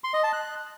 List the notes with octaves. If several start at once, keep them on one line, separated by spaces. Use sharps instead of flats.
C6
D#5
A5
F#6